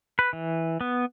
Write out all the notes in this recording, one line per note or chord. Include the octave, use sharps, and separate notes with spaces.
B4
E3
B3